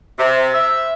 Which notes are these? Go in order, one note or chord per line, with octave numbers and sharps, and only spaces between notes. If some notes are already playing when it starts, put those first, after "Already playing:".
C3
E5